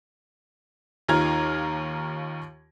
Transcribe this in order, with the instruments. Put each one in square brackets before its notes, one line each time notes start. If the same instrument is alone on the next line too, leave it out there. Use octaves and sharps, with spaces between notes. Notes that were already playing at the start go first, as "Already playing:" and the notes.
[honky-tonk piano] D#2 D#3 F4 A#5 F6 G#6